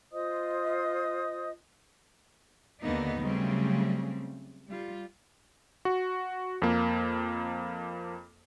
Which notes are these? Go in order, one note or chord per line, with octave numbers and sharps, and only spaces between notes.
F4 C5 D#5 D#6
D#2 D3 A#3 B3 D#4
C#3 F#3 G3 A3 C4
G3 F4
F#4
F2 A#3